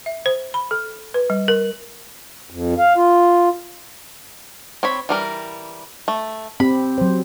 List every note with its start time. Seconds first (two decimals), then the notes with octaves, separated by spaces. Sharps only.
0.06 E5
0.26 C5
0.54 B5
0.71 A4
1.14 B4
1.30 G3
1.48 A#4
2.50 F2
2.79 F5
2.96 F4
4.83 C4 C#5 B5
5.09 E3 G3 A#4
6.08 A3
6.60 C4 G4 B5
6.98 F#3 C5